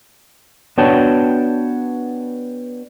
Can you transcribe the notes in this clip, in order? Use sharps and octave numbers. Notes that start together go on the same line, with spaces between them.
B3 D4 F#4 C#5 G5 A5